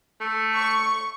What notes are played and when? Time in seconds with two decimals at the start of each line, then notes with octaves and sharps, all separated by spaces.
0.20 A3
0.55 C#6